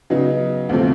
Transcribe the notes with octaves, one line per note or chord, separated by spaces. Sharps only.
C#3 F#3 B3 D#4
D2 C3 F3 A3 C4